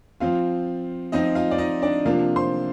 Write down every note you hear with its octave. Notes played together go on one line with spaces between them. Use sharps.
F3 C4 F4 F5
F3 C4 D#4 F4 D#5
F4 F5
D5
D#4 D#5
D4 D5
C3 F3 A#3 D4 F4 F5
C5 C6